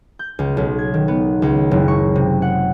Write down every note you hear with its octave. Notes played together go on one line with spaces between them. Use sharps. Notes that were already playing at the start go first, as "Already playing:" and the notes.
G6
C#2
B1
G#6
D#3
B3
C#2
F#1
C#6
C3
F#5